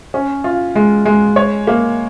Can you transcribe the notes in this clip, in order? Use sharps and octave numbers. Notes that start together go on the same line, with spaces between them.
C#4
F4
G#3
G#3
C#5
A#3